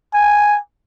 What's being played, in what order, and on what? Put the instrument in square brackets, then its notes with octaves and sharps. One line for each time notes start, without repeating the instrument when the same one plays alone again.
[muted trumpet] G#5